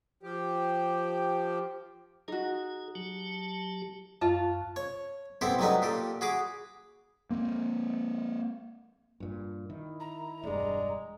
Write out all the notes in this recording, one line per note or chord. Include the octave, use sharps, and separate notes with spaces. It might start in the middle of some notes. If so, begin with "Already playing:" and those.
F3 G4
D#4 F#4 G#4
F#3 G4 A5
F#2 F4 A5
C#5
A3 B3 C4 E4 G4 A4
F#3 G3 A3 D#4 B4
A#2 G4 A4
F#4 G#4 B5 D6
A#3 C4
G2 A#2
D#3 E4
A#5
E1 G2 G#3 D5